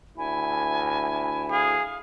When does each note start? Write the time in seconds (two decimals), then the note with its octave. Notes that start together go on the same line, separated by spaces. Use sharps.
0.18 D2 E4 G#5
1.51 G#4 F5